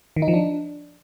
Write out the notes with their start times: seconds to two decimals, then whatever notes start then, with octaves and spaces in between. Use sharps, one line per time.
0.16 D#3
0.22 D#4
0.28 F3
0.34 D4